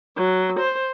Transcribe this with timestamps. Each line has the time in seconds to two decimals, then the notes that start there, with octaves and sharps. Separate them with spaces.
0.16 F#3
0.58 C5